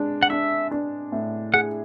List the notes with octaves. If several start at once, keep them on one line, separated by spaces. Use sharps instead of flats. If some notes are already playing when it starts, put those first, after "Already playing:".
Already playing: G#3 D4
F#5
D4 E5
D4
A2
G#4 F#5